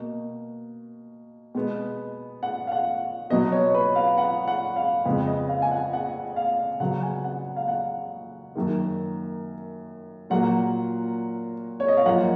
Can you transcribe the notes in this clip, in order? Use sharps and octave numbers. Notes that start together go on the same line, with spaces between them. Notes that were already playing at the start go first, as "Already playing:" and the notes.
Already playing: B2 A#3
B2 G#3 B3
F#5
F5
F#5
B2 F#3 B3 D#5
C#5
B4
F5
F#5
F#5
F5
F2 C#3 G#3 B3
D#5
F5
G#5
F#5
F#5
F5
C#3 F#3 B3 F#5
G#5
F#5
F5
F#5
F#2 D#3 A#3
A#2 F#3 A#3 F#5
C#5
D#5
F5
F#2 F3 A#3 F#5